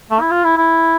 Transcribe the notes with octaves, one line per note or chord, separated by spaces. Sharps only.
A3
E4
F4
E4
E4